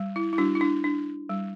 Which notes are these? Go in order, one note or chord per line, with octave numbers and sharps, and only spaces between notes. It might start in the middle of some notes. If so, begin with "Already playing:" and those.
Already playing: G3
E4
E4
G3 D4 F#4
E4
D4
D4
G3